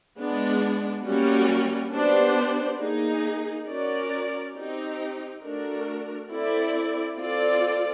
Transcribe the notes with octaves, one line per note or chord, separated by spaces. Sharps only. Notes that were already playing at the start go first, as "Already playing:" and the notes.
G#3 B3 D4
G3 A#3 C#4 F#4
B3 D4 G4 C5
A#3 D#4 G#4
C#4 F#4 A#4 D5
C4 D#4 G4
A3 D4 F#4 A#4
C4 E4 A4 D5
C4 F4 A4 D5